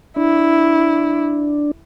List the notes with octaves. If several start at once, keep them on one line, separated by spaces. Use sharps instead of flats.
D4 E4